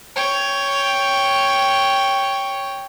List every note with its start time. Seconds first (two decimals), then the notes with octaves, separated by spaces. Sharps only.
0.16 C#5 G5